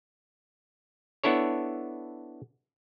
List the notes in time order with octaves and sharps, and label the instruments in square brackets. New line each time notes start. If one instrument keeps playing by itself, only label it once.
[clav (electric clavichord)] B3 D4 E4 A4 C#5